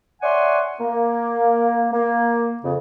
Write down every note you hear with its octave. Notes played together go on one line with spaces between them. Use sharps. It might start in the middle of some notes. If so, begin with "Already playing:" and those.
C#5 D5 E5 F#5 G#5 C6
A#3
A#3
F2 C#3